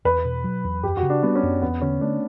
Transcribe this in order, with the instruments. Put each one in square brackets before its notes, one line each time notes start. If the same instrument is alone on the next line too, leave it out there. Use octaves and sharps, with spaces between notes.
[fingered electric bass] E2 [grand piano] B4
[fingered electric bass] B2
F#3
E2
[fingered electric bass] F#2 [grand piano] G4
[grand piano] F#4
[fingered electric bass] C#3
[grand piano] D4
[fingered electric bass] G3 [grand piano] B3
[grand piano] C#4
[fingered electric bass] F#2
[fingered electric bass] E2 [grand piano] B3
[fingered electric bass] D3 [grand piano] C#4
[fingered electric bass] A3 [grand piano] D4